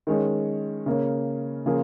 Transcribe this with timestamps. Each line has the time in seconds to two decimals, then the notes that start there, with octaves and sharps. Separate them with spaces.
0.07 D#3 G#3 C#4
0.86 C#3 A#3 C#4
1.66 C#3 F3 A#3 F4 G#4